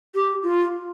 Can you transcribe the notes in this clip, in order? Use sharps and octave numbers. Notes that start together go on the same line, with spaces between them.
G4
F4